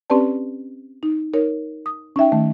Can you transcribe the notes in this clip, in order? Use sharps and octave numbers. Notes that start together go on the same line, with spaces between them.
C4 C#4 G4 B4 D5 A5
D#4
D#4 A#4 C#5
D#6
C#4 D#4 E5 G5
D#3 A3